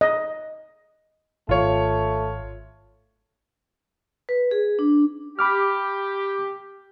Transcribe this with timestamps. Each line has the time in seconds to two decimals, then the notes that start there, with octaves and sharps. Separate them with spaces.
0.01 D#5
1.49 G#1 A3 F4 C#5
4.29 B4
4.51 G#4
4.79 D4
5.39 G4 B5 D6 F6